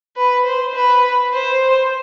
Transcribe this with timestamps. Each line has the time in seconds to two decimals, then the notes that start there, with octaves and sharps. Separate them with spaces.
0.17 B4
0.46 C5
0.75 B4
1.33 C5